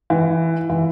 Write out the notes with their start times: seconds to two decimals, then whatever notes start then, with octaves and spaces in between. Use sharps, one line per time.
0.10 E3
0.69 E3